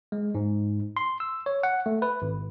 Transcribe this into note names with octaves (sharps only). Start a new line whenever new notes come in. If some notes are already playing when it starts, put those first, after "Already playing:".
G#3
G#2
C6
E6
C#5
F#5
A3
B4
G#1